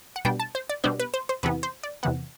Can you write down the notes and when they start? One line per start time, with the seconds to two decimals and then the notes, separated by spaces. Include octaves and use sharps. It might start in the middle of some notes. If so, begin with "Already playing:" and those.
0.16 F#5
0.25 B2 G3 B3 D4 G5
0.40 A5
0.55 C5
0.69 D5
0.84 B2 G3 B3 D4 C5
1.00 B4
1.14 C5
1.29 C5
1.43 E2 C3 E3 B3 B4
1.63 C5
1.83 D5
2.03 E2 C3 E3 B3 F#5